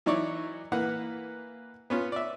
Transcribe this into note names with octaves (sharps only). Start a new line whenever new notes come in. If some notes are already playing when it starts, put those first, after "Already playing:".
E3 F#3 D#4 E4 C#5 D5
E3 A#3 B4 F#5
B3 C#4 F4
D5 E5